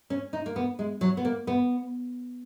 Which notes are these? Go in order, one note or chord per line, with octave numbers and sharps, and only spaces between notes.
C#4
D#4
A#3
B3
G#3
F#3
B3
A#3
B3